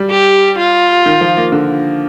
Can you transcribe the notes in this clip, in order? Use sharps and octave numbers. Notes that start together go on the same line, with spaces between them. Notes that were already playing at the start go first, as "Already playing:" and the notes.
Already playing: G3
G4
F4
D#3
F3
A#3
D3